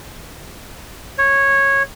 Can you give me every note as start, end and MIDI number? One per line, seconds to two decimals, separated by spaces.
1.18 1.83 73